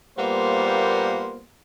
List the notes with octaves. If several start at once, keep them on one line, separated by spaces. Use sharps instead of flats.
A#2 G3 A#3 B3 C5